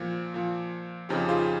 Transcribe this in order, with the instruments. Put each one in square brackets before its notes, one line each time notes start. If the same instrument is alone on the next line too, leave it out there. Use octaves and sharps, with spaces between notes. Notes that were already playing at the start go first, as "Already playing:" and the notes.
Already playing: [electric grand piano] A#2 F3
A#2 F3
F2 C#3 F3 D#4 G4
F4 G#4